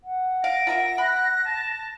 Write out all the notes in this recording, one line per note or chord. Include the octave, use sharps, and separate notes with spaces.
F#5
F5 A#6 D7
F4 A#4 E5
B5 F#6
A5